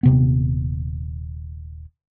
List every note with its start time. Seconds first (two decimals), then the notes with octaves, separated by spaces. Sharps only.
0.03 D#1 C3 B3